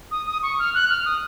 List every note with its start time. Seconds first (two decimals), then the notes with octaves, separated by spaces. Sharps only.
0.11 D#6
0.27 D#6
0.43 C#6
0.59 F6
0.74 F#6
0.89 F6
1.05 D#6